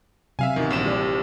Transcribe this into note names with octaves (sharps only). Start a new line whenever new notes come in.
C3 F#3 E5 F5 G#5
G1 D#3 E3 F#4
A#1 G2 E7
G3 G4 D5